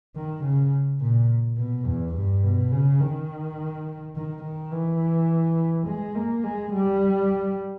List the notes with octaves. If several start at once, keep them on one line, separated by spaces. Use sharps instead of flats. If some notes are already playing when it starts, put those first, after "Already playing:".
D#3
C#3
A#2
B2
E2
G2
B2
C#3
D#3
D#3
D#3
E3
G#3
A#3
G#3
G3